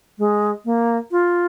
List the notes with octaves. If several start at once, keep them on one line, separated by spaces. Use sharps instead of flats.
G#3
A#3
F4